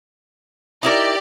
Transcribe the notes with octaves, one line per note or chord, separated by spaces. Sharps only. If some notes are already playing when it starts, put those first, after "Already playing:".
D#4 E4 G4 A#4 D5